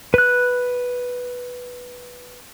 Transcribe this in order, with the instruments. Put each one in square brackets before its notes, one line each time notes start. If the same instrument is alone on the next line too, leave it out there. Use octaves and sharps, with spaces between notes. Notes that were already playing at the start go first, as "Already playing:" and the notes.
[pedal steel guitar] B4 F#6